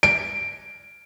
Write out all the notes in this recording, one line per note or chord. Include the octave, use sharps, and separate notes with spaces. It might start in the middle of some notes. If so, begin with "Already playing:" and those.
D7